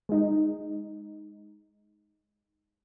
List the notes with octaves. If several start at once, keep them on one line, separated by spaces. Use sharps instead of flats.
G#3 D#4